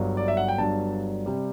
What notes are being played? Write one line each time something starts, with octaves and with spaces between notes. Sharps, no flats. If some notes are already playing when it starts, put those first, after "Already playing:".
Already playing: G1 G2 F#3
D5
E5
F#5
G5
G1 G2 F#3 A5
C3 G3